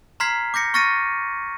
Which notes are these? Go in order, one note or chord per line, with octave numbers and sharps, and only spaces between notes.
A#5 C6 F6 G#6 B6 C7
D6 G6 A#6 C#7
C#6 F6 A6 A#6 C#7 D#7